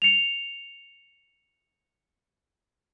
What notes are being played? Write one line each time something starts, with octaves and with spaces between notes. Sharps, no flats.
C#7 F7